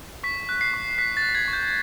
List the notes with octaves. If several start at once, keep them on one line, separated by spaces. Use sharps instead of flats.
C#6 B6
F#6
C7
C#6
F#6 B6
A6
F#6
G#6
C#6
G6